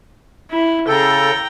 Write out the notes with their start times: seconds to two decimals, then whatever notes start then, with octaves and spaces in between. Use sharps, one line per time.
0.51 E4
0.88 C#3 A4 G5 A#5